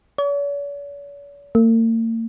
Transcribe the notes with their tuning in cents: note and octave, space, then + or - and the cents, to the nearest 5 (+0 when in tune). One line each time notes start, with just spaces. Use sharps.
C#5 +45
A#3 -45